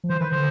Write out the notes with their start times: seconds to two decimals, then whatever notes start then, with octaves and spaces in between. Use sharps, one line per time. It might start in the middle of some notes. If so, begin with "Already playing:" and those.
0.04 F3
0.10 E3 C5
0.20 D#3 B4
0.32 D3 C5